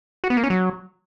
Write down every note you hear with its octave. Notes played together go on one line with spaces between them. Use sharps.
F#4
B3
A#3
C#4
F#3